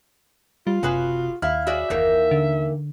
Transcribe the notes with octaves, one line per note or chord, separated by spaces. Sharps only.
G3 F4
F#1 C3 F#4 G#4 B4
D#2 E4 F5 F6
F#4 G#4 D5 E5
F#1 D#2 D#3 E3 A#3
D3